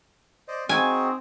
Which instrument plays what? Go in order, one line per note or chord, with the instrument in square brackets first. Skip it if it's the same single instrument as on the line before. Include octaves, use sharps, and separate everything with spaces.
[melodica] C5 D5 D#5
[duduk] C4 [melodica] D#4 F#4 G#4 [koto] G#5